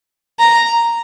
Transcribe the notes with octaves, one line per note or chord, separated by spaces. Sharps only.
A#5